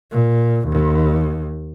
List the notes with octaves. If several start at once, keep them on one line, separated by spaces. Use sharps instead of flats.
A#2
D#2